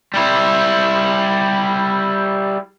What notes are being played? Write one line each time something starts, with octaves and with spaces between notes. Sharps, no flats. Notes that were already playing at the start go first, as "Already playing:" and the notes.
G3 E4